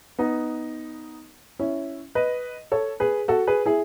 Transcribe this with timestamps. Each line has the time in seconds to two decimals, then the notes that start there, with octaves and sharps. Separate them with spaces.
0.19 B3 D#4
1.59 C#4 E4
2.15 B4 D#5
2.72 A4 C#5
3.00 G#4 B4
3.28 F#4 A4
3.47 G#4 B4
3.66 E4 G#4